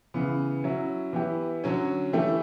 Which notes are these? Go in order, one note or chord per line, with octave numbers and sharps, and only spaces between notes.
C#3 E3 B3
F#3 C#4 E4
E3 B3 E4 G4
D3 F#3 C#4
E3 A3 E4 G4